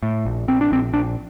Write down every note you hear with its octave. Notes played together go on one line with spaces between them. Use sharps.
A2
A#1
A#1 C4
D4
A#1 C4
A#1 D4